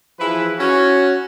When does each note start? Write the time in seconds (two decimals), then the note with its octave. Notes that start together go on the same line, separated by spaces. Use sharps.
0.19 E3 F3 E4 G#4 B4
0.58 C#4 F#4